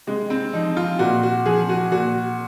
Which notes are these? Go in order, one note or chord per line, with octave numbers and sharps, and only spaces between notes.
C3 G#3
C4
F3 D#4
F4
A#2 F#4
F#4
F3 G#4
F#4
A#2 F#4